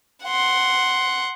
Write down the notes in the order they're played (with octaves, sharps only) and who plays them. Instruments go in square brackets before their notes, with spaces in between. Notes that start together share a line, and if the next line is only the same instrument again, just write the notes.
[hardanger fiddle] F#5 C6